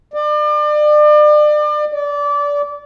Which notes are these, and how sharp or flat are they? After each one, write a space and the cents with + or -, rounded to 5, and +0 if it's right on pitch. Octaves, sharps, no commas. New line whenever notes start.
D5 +35
D5 -25